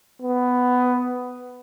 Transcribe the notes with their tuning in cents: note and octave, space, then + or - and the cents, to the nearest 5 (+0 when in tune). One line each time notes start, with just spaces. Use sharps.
B3 +10